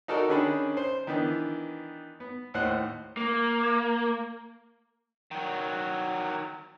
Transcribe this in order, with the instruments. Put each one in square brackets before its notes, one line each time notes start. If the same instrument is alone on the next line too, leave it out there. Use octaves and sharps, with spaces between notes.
[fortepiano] D#4 F#4 A4 A#4 D5
D#3 C#4 D4 G#4 B5
C5
D#3 E3 B3 D4
B3
D#2 A2 C5 F#5 F#6
[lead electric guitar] A#3
D#3 F#3